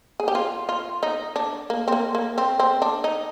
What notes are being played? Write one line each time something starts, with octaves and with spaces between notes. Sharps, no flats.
G#4
G4
F4
F4
D#4
D4
A#3
C4
A#3
A#3
C4
C4
D4
D#4